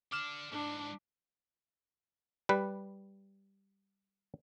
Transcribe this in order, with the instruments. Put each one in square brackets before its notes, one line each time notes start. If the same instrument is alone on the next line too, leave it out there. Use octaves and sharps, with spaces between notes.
[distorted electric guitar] D3 D4 [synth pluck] D6 F6 E7
[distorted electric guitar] G#2 E3 [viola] D4
[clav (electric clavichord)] G3 B4